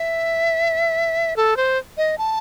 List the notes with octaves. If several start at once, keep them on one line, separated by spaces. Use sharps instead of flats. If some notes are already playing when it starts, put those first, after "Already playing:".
Already playing: E5
A4
C5
D#5
A5